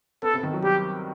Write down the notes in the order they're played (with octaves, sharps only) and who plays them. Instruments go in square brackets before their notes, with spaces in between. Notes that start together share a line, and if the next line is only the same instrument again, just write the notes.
[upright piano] B3 [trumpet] A4
[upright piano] C3
D#3
F#3
[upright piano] G3 [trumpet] G4